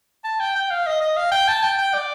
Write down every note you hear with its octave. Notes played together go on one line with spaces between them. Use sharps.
A5
G5
G5
F5
D#5
D#5
F5
G5
A5
G5
G5
D5